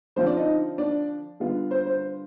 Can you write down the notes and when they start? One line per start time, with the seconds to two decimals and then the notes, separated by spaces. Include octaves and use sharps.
0.16 D3 F3 C4 F4 C5
0.26 D4 D5
0.37 D#4 D#5
0.78 D4 D5
1.40 D3 G3 B3 F4
1.71 C5
1.86 C5